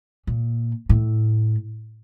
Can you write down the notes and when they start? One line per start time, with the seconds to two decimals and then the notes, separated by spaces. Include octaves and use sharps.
0.27 A#2
0.89 A2